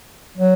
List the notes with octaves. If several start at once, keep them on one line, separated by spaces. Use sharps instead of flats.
F#3